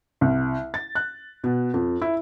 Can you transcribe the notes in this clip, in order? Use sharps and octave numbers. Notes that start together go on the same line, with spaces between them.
C2
A6
F#6
B2
F2
E4